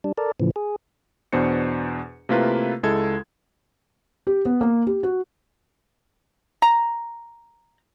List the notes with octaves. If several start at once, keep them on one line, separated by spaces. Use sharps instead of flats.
G3 D4
A4 A#4 D5
A2 C#3 E3 F3
G#4
E2 B2 D4 C5 C#7
C3 A3 A#3 E4 F4 B4
C#2 G#3 E4 A4 G#6
G4
B3
A#3
G4
F#4
A#5